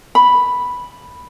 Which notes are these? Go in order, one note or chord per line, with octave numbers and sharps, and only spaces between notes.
B5